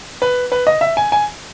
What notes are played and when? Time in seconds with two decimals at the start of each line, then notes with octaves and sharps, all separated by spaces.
0.22 B4
0.52 B4
0.67 D#5
0.81 E5
0.97 G#5
1.12 G#5